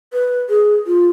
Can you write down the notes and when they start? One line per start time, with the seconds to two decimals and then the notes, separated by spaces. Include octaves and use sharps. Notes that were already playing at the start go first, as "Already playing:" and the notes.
0.13 B4
0.49 G#4
0.87 F4